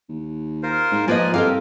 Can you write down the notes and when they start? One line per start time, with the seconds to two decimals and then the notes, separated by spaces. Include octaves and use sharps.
0.09 D#2
0.63 F4 A#4 C5
0.92 G#2
1.08 F3 A#3 B4 D5 D#5 G#5
1.34 C2 F4 G4 A4 A#4 F5